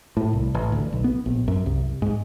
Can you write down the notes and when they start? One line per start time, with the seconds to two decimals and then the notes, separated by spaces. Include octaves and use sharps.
0.17 A2
0.33 C2
0.54 A1
0.72 D2
0.93 B1
1.04 B3
1.26 A#1
1.48 F#2
1.66 C2
2.02 G#2